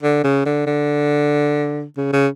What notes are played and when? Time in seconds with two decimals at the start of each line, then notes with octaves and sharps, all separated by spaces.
0.03 D3
0.24 C#3
0.46 D3
0.67 D3
1.97 C#3
2.13 C#3